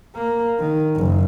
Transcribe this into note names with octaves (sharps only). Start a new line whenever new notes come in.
A#3
D#3
F#1